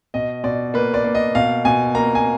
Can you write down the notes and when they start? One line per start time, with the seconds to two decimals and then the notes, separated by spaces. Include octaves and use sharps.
0.14 B2 D#5
0.44 B2 D5
0.74 A#3 B4
0.94 D5
1.04 A#3
1.15 D#5
1.35 B2 F5
1.65 B2 G#5
1.95 A#3 A#5
2.15 G#5